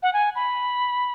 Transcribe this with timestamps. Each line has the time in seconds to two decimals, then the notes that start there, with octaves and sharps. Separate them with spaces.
0.03 F#5
0.13 G#5
0.36 B5